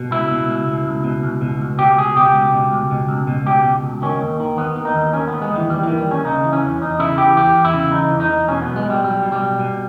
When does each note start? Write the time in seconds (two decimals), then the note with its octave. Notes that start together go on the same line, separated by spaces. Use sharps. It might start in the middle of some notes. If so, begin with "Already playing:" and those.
Already playing: B2
0.11 C#2 E4
0.31 B2
0.49 C#2
0.67 B2
0.85 C#2
1.04 B2
1.23 C#2
1.41 B2
1.61 C#2
1.78 B2 G4
1.98 C#2 G#4
2.16 B2 G4
2.34 C#2
2.53 B2
2.72 C#2
2.91 B2
3.08 C#2
3.27 B2
3.46 C#2 G4
3.64 B2
3.84 C#2
4.02 D#3 C#4
4.21 D#2
4.40 D#3
4.58 D#2 B3
4.76 D#3
4.85 D#4
4.95 D#2
5.13 D#3 C#4
5.27 B3
5.33 D#2
5.42 G#3
5.51 D#3 E3
5.69 D#2 G3
5.83 D#3 E3
5.98 G3
6.06 D#2 C#4
6.25 C#3 D#4
6.44 E3
6.53 C#4
6.62 E2
6.81 E2 D#4
6.99 C#3 E4
7.18 E3 G4
7.37 E2 G4
7.55 E2
7.64 E4
7.74 C#3
7.92 E3 D#4
8.12 E2
8.20 D#4
8.30 E2
8.48 B2 C#4
8.62 B3
8.67 B1
8.76 G#3
8.86 B2 G3
9.04 B1 G3
9.23 B2
9.32 G3
9.41 B1
9.59 B2